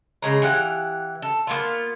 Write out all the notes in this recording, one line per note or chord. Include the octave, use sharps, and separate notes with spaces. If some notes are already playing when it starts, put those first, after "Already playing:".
C#3 G#3 A#5
E3 G4 F5 F#5
A4
A#3 B3 F4